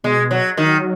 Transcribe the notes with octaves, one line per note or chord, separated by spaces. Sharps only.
B2 G#3
F#3
D#3 F#3